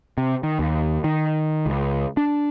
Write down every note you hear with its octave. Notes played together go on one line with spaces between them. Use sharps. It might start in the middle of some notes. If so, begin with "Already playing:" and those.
C3
D#3
D#2
D#3
C#2
D4